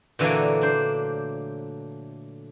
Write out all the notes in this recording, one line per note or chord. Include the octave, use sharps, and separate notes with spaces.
A#2 D3 E3 F#3 A3 A#3
D4 C5